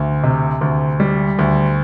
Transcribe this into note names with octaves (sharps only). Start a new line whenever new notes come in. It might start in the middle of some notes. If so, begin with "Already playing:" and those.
Already playing: D2
C3
D2
G3
D2